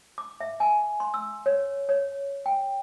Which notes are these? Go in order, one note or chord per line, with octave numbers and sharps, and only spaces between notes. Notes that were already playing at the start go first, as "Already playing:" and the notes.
D6
E5
G#5
C6
E6
C#5
C#5
G5